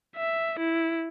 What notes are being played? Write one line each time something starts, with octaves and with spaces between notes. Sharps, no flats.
E5
E4